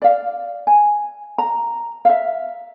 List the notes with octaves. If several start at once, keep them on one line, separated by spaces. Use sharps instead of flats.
D5 F5
G#5
A#5
E5 F5